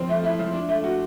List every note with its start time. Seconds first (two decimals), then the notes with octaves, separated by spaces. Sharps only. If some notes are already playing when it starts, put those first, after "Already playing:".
Already playing: F3 C4
0.09 A3
0.23 E4
0.39 F3
0.54 D4
0.69 A3
0.84 F#4